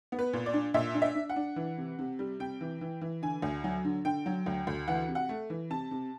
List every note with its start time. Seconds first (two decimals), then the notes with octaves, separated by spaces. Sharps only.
0.12 B3
0.19 B4
0.33 A#2
0.46 D5
0.54 D4
0.74 A#2 E5
0.94 D4
1.02 E5
1.15 D4
1.30 F#5
1.36 D4
1.56 E3
1.78 C3
1.99 C3
2.19 G3
2.40 C3 G5
2.61 E3
2.81 E3
3.01 E3
3.22 D3 G#5
3.42 D2
3.64 F#3
3.85 D3
4.05 D3 G5
4.26 F#3
4.46 D2
4.67 D2
4.88 E3 F#5
5.08 C3
5.15 F#5
5.29 A3
5.50 E3
5.70 C3 A5
5.91 C3